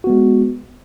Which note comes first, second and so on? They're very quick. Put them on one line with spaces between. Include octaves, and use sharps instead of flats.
F#4 B3 G#3